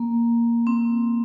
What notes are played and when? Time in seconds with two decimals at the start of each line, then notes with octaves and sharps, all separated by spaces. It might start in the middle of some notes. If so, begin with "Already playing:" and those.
Already playing: A#3
0.67 C4